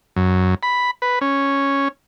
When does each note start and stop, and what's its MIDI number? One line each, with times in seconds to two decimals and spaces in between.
0.16 0.55 42
0.63 0.91 83
1.02 1.19 71
1.21 1.88 61